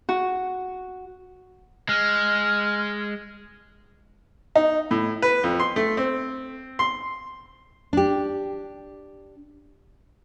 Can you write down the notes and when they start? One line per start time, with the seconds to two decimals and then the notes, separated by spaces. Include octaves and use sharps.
0.09 F#4
1.89 G#3 F6
4.56 D#4
4.91 A2
5.22 B4
5.44 F2
5.60 C6
5.76 A3
5.97 C4
6.79 C6
7.93 D4 G4